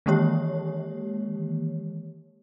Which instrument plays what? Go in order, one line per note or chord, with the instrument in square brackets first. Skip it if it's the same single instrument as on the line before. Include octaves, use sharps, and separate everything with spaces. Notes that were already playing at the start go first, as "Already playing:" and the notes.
[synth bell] D#3 E3 G#3 A#3 G4 C#5